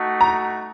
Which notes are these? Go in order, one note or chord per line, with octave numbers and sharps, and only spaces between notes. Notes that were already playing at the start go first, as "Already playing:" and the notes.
Already playing: A3 D#4 F#4
A#5